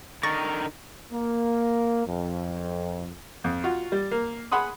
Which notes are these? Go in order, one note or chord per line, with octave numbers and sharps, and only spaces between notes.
D3 D#4 A#4 C#6 A6 A#6
A#3
F2
F2
F4 F#4
G3
A#3
G#4 F#5 B5 C6 D#6